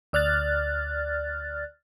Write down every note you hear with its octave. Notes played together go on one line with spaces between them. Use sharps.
D2 D5 F6 F#6 A6